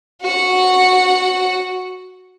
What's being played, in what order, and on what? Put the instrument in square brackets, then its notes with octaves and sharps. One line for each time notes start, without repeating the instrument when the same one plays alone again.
[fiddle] F#4 F#5